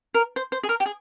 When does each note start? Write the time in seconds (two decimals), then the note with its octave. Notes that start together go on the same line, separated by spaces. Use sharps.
0.14 A#4
0.36 C5
0.52 C5
0.63 G#4
0.69 A#4
0.80 G4
0.86 G#4